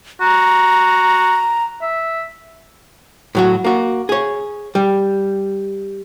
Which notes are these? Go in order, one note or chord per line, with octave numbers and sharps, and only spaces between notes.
F#4 A#5
E5
A2 F#3 F#4
A#3 F#4
G#4 C#5
G3